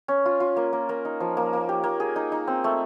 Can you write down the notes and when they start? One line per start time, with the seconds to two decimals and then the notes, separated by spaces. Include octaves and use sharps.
0.08 C#4
0.25 F4
0.40 F4
0.56 A#3
0.73 A#3
0.89 A#3
1.05 D#4
1.20 F3
1.37 A#3
1.53 A#3
1.69 G4
1.84 A#3
2.00 G#4
2.16 D#4
2.32 D#4
2.47 C4
2.64 A3